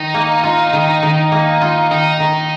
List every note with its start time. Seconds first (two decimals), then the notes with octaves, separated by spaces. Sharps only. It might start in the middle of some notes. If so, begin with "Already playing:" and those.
Already playing: D#3 D#4
0.14 A#3
0.44 F4
0.73 D#3
1.03 D#3
1.32 A#3
1.61 F4
1.91 D#3 D#4
2.20 D#3